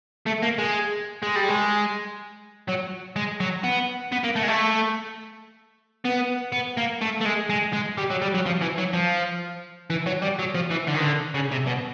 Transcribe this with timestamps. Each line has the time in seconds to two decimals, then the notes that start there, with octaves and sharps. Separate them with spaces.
0.26 A3
0.42 A#3
0.58 G#3
1.23 G#3
1.36 G3
1.49 G#3
2.68 F#3
3.16 G#3
3.40 F#3
3.64 B3
4.12 B3
4.24 A#3
4.36 A3
4.43 G#3
4.48 A3
6.05 B3
6.52 B3
6.77 A#3
7.02 A3
7.21 A3
7.25 G#3
7.50 G#3
7.73 G#3
7.98 G3
8.10 F#3
8.22 G3
8.34 F#3
8.46 F3
8.62 E3
8.78 F#3
8.93 F3
9.90 E3
10.06 F#3
10.22 G3
10.39 F#3
10.55 F3
10.71 E3
10.87 D3
10.94 D#3
11.01 D3
11.34 C#3
11.52 C3
11.67 B2